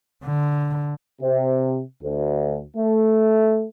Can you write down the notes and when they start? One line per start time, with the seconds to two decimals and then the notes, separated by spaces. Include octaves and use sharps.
0.24 D3
1.22 C3
2.02 D2
2.76 A3